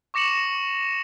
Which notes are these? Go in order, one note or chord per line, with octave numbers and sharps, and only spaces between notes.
C#6 D6 A#6 C#7 E7 F#7